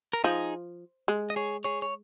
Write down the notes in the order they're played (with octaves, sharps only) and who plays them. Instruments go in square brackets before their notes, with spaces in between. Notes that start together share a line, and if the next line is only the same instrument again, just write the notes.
[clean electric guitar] A#4
[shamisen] F3 [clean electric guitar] D#4 G#4
[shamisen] G#3
[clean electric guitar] D#5
G#4 C#5
G#4 C#5
C#5